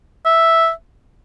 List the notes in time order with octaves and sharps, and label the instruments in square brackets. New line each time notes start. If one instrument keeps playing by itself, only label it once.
[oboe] E5